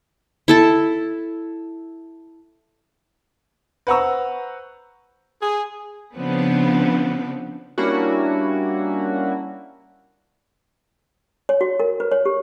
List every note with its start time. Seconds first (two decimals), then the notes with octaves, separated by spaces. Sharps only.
0.48 E4 A4 A5
3.87 B4 C5 F#5 A#5 C#6 E6
5.41 G#4
6.16 C#3 F3 B3 C4 D4 B4
7.78 G3 A#3 C#4 D4 E4 F#4
11.49 C#5
11.61 F#4
11.80 A#4
12.00 B4
12.12 C#5
12.25 G4